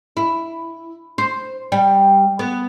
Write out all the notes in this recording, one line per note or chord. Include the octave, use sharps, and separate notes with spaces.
E4
C5
G3
B3